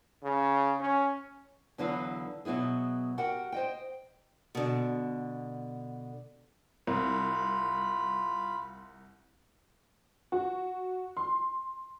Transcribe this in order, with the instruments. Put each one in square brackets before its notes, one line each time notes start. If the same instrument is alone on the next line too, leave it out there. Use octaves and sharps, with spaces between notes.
[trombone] C#3
C#4
[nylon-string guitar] E2 D3 F#3 E4 B4 F5
B2 F#3 B3 E4 G#4
F#4 G4 A#4 F#5 G5
C5 D#5 G5
[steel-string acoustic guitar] B2 D3
[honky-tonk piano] C2 [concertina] F4 B5
[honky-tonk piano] F#4
C6